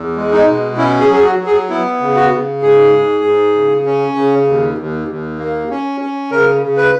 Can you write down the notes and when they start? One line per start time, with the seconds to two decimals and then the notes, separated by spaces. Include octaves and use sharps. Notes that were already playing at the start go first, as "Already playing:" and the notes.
Already playing: E2
0.16 G#3
0.32 D#4
0.46 B2
0.77 C#4 E4
1.00 G#4
1.09 F#3
1.14 G#4
1.24 F#4
1.39 F#3
1.46 G#4
1.69 B3 E4
2.01 C#3
2.16 F#4
2.31 C#3
2.63 G#2 G#4
2.93 G#2
3.24 G#2
3.55 C#3
3.86 C#4
4.16 C#3
4.47 D#2
4.78 D#2
5.08 D#2
5.39 A#3
5.70 C#4
6.01 C#4
6.31 C#3 A#4
6.62 C#3
6.77 B4